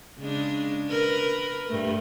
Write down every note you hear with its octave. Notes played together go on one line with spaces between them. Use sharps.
C#3 G#3 D4
A#4 B4
G2 A3